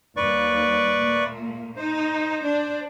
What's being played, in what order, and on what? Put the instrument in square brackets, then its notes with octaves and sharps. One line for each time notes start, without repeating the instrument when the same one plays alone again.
[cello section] D#2 G3 [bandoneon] B4 D5 C#6
[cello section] A#2 A3 A#3
[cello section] D#4 [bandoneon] C5
[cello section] D4